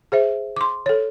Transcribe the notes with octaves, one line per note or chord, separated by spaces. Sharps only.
G#4 C5 E5
C6 D6
A4 C#5